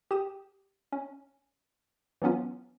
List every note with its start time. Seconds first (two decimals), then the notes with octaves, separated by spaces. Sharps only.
0.11 G4 G5 D#6 E7
0.92 C#4
2.22 E3 F#3 B3 C#4 F4